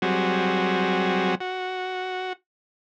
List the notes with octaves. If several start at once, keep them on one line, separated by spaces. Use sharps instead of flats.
F#3 G3 C4 F#4 G#4
F#4